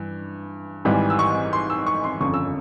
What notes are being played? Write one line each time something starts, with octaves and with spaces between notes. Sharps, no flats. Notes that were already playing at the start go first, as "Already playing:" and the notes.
Already playing: G2 E3
G#1 G#2 E3 G3
E6
C#6
C6
E6
C#6
C6
G1 F2 C#3 C#6
E6